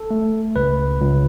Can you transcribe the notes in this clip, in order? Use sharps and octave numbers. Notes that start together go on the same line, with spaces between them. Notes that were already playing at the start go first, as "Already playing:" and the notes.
Already playing: A4
A3
C#2 B4
C#2